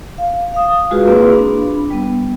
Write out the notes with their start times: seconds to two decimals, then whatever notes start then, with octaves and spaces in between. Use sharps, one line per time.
0.18 F5
0.54 F5 D#6
0.91 G#3 F4 F#4 G#4 B4 F5
1.05 A#3 C4 E4 F4 G#4 B4
1.32 D4 B5
1.90 G3 B3